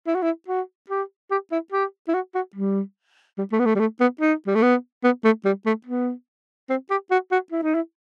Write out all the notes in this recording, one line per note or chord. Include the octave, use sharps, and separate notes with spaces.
E4
F#4
E4
F#4
G4
G4
E4
G4
E4
F#4
F#4
G3
G3
A3
B3
A3
G3
A3
B3
D#4
G3
A3
B3
B3
A3
G3
A3
B3
C4
G4
F#4
F#4
E4
D#4
E4